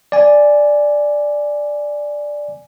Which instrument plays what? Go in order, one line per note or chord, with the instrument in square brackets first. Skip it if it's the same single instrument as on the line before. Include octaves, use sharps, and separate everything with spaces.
[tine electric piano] D5 G#5